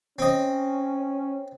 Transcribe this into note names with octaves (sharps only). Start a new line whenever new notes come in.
C4 C#4 D#5